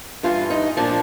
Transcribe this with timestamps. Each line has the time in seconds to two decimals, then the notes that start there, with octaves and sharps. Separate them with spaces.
0.23 G2 E3 F4
0.50 D#4
0.77 A#2 F3 D4